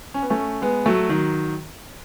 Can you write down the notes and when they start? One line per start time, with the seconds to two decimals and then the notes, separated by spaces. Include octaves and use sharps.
0.14 C#4
0.22 B3
0.30 A3 C#4
0.62 G#3 B3
0.86 F#3 A3
1.09 D#3 F#3